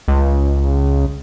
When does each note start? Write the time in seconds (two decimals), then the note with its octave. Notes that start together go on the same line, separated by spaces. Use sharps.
0.08 C#2